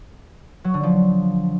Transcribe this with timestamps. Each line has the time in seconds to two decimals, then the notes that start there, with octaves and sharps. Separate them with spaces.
0.64 F#3
0.74 D3
0.83 F3